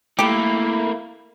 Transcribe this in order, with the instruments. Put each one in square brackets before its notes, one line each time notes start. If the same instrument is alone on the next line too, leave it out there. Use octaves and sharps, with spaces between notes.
[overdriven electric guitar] A3 A#3 [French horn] E4 [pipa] G4 A4 [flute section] B5